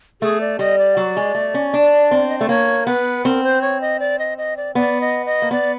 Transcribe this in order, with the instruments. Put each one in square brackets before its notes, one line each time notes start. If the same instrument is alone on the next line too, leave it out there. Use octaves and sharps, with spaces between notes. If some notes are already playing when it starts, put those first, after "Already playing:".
[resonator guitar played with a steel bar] A3 [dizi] G#4
[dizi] D5
[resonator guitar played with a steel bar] G3 [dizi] D#5
[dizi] D5
[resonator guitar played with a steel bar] F#3
G#3
A3
C#4
D4
C4
[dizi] D#5
[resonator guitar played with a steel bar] A3 [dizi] D5
[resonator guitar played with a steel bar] A#3 [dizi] C#5
[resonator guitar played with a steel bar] B3 [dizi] B4
[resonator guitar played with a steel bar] C4 [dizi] A#4
[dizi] C5
C#5
D#5
D5
D#5
D#5
D5
[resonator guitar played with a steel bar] B3 [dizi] D5
[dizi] D#5
D#5
[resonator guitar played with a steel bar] A#3
[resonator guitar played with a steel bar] B3 [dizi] D5